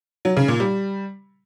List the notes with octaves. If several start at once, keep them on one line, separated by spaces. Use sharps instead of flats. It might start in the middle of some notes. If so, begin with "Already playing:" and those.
F#3
C#3
A#2
G3